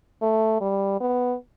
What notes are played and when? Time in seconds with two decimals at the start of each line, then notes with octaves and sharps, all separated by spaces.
0.22 A3
0.61 G3
1.00 B3